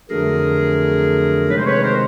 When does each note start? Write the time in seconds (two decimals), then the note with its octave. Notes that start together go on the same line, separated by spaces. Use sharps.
0.10 F2 D3 F#3 A3 G#4 A#4
1.49 C3 D#3 G#3 B4 C#5
1.57 C5
1.66 B4 C#5
1.83 A#4 C5